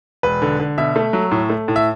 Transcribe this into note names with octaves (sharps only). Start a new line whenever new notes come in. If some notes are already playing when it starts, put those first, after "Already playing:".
E1 B4
D3
D3
B2 E5
A3
F#3
A2
A3
A2
E5